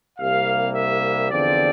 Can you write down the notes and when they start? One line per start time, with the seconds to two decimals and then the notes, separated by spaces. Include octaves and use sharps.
0.19 C2 C3 G3 A#3 F5
0.75 E5
1.30 E2 D3 F3 C4 D5